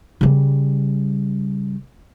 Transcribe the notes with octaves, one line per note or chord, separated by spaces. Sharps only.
C#3 G3